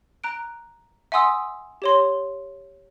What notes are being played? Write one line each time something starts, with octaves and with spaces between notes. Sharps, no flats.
A#5 F#6 D7
E5 F#5 G#5 C6 D#6 E6
G4 C#5 C6